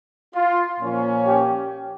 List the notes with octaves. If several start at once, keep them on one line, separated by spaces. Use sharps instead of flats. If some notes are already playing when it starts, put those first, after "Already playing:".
F4
A#2 F3 A#3 C#4
G4